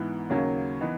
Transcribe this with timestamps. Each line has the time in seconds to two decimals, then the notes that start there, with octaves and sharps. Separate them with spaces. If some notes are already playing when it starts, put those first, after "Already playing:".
Already playing: G#2 E3 B3 E4
0.30 D#2 C#3 F#3 A#3 C#4
0.81 E3 B3 D#4